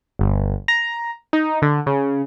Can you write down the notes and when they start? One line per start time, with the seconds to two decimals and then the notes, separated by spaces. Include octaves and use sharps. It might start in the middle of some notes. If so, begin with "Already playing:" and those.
0.19 G1
0.68 A#5
1.33 D#4
1.62 D3
1.86 C#3